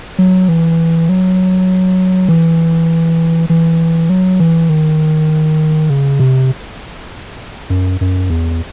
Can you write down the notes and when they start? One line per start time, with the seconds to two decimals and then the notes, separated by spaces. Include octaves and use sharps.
0.18 F#3
0.49 E3
1.09 F#3
2.28 E3
3.50 E3
4.09 F#3
4.40 E3
4.69 D#3
5.90 C#3
6.19 C3
7.70 F#2
8.01 F#2
8.30 E2